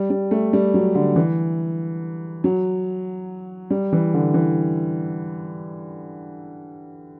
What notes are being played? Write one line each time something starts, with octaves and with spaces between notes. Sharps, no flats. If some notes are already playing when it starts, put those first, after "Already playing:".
Already playing: G3
G3
A3
G3
F#3
D3
E3
F#3
G3
E3
D3
E3